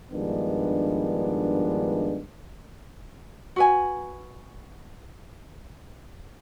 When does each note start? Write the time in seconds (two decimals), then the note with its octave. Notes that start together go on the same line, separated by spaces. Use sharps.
0.12 G2 D#3 F3 G#3 B3 D4
3.56 F#4 B4 G#5